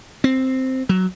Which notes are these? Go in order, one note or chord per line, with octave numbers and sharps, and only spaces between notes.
C4
F#3